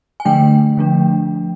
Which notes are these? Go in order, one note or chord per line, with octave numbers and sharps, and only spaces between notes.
G#5
D3 F3 A3 D4 G5
D3 F3 A3 D4